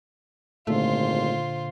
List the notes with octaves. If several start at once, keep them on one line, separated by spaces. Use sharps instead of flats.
G#1 A#2 D3 A3 F4 C5